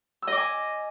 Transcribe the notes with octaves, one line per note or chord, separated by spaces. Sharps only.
D#5 G#5 D6 E6